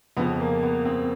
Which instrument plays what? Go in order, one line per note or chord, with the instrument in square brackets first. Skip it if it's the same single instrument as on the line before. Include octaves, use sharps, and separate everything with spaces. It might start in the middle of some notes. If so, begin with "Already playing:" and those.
[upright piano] F2 C#3 F3 B3
A#3
B3
C4